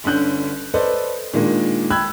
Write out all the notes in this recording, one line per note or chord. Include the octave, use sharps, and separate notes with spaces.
G1 D3 C#4 F#6 G6
A4 B4 C5 D5 D#5
A#2 D#3 G#3 A#3 D4
G5 B5 E6 F#6 G#6